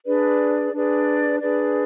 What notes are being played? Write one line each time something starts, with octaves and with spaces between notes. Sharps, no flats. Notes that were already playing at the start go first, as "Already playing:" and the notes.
D4 G#4 B4 D5
D4 G#4 B4 D5
D4 G#4 B4 D5